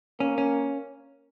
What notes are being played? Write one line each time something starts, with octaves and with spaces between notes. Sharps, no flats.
A#3 C#4
C#4